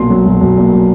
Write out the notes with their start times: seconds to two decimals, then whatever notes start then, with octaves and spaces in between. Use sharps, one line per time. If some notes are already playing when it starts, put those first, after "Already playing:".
Already playing: B1 A#2 C6
0.10 F#3
0.26 B1
0.41 B1
0.57 A#2
0.73 F#3